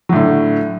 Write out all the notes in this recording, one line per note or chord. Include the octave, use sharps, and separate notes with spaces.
A2 D3 F#3